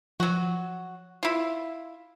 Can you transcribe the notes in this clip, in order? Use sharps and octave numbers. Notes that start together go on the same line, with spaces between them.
F3 F#3 F#4
E4 F4